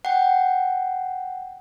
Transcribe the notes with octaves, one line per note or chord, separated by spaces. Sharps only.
F#5 G5